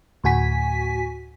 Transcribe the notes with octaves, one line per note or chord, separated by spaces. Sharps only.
D2 A2 F#4 G#5 B6